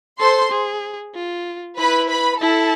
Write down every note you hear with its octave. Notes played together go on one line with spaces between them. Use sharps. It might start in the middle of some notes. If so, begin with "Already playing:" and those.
A4 C5 C6
G#4
F4
E4 B4 B5
B4 B5
E4 A4 A5